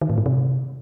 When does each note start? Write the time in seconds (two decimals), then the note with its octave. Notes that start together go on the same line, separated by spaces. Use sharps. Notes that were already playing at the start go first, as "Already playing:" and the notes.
0.01 D#3
0.10 A2
0.18 G#2
0.26 C3